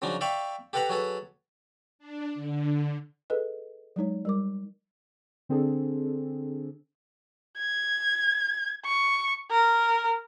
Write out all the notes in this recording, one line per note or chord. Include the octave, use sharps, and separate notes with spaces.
C#3 F3 F#3 D4 D#4
D5 E5 F5 G5 B5 C#6
G4 A4 B4 F#5 A#5 B5
F#3 G#4 A4 B4
D4
D3
G#4 A4 B4 D#5
F#3 G#3 D#4 C#5
G3 A#4 D6
D3 C4 D4 G#4 A4
G#6
C#6
A#4